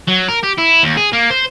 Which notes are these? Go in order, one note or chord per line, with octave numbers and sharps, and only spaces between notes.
F#3
A#4
G4
E4
D#2
G#4
A#3
C5